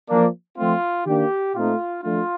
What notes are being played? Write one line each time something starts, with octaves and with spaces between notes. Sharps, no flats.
F3 A#3 D4
F3 A3 C4 F4
D#3 A#3 D4 G4
A#2 A3 C4 D#4 F4
F3 A3 D4 F4